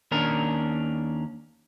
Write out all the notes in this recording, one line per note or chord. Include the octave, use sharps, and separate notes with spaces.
D#2 C#4 D4 A#4